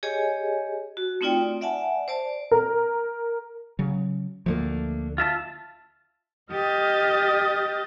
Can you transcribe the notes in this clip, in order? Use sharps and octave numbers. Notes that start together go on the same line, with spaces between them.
G4 G#4 C#5 D#5 G#5
F#4
A3 C4 D#4 F4 D5 G5
D5 E5 F#5 G#5 A5
C5 D5 A5
A#4
C#3 F#3
D2 F3 A3 A#3 D4
F4 E5 A5
G4 D#5 D#6 F6 G6 A6